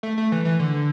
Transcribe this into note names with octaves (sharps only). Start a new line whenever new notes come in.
A3
A3
E3
E3
D3